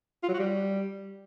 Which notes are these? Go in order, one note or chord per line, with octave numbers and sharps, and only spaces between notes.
F4
F#3
F#4
G3